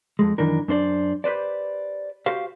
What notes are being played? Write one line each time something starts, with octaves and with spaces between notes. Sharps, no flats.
F2 G#3
F#2 D#3 E3 D4 A#4
F#2 D4 C5 D5
G4 B4 C5 D5
F#4 G4 C5 F5